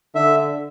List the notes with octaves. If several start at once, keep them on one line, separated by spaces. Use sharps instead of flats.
D3 E5